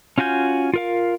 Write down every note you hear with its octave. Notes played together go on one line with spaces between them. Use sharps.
C#4 F4 F#4 G#5 G6
F4 A#4 F5